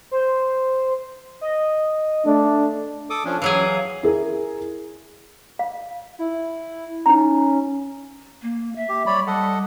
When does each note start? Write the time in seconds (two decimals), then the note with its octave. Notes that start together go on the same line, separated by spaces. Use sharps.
0.11 C5
1.41 D#5
2.25 A3 D4
3.10 A4 D6 D#6
3.25 F3 C#4 D4
3.42 E3 F#3 G#4 F5
4.03 E4 G#4 A#4
5.59 F5
6.19 E4
7.06 C#4 D#4 A#5
8.42 A#3
8.76 E5
8.89 G4
9.07 G3 C#5 D5 B5
9.27 G3 A4 D#5 F#5